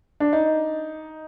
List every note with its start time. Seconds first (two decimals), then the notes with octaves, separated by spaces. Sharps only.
0.20 D4
0.33 D#4